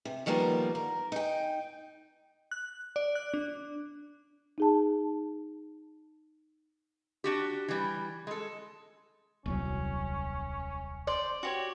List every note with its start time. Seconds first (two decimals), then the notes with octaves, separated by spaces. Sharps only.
0.05 C3
0.26 D#3 F3 G3 A#3 B3
0.75 A#4
1.12 D#4 G5
2.51 F#6
2.96 D5
3.15 F#6
3.34 D4
4.58 D#4 G#4 A5
7.24 D4 F#4 G4
7.68 E3 G3
8.27 G#3 A4
9.46 D#1 C2 F#3 C#4
11.07 C5 D5
11.43 F#4 G4 C#5